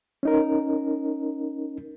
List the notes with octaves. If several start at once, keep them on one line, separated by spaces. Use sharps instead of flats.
C#4 D#4 A#4